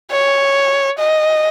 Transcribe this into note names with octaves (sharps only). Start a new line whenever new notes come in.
C#5
D#5